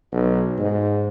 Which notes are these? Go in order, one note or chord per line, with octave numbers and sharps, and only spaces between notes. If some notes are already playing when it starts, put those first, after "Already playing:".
B1
G#2